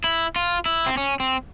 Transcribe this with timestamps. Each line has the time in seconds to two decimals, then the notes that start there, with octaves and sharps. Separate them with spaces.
0.04 E4
0.36 F4
0.66 E4
0.86 C4
0.97 C#4
1.20 C4